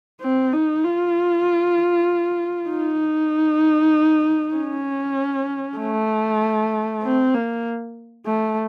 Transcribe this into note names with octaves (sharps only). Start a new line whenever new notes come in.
C4
D#4
F4
D#4
C#4
A3
C4
A#3
A3